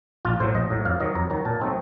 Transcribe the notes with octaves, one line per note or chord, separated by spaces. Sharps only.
A#1 F4
A2 F#3 C5
A#1 D#5
A2 F#3
F2 F5
D#3 F#3 D#5
F2 A#5
D#3 F#3 A#5
A#2 A5
F#3 A3 C4 D#4